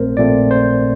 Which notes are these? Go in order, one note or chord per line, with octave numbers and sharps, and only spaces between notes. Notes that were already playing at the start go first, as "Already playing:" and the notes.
Already playing: A#1 A#2 A3 C4 A#4 C5
A#1 A#2 A3 C4 D5
C5